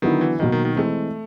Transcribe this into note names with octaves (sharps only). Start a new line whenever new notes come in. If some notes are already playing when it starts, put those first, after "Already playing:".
D3 D#3 F#3 B3 E4
E3
B2 D#3 F#3 A#3 D#4
D#3
D#3
E3 G#3 A3 C4